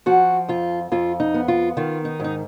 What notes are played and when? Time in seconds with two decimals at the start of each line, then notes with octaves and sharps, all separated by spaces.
0.06 F3 F#4
0.48 F2 F4
0.92 F2 F4
1.20 D#4
1.34 B3
1.48 F4
1.77 D#3 F4
2.05 D#4
2.19 G#2 D#4